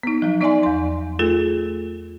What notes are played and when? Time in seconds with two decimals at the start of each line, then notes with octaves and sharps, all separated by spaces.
0.03 B3 D#4
0.22 F3 F#3
0.41 B3 D#4 D5 E5 G#5 C6
0.63 E2 C6
1.19 A3 F4 G#4 A4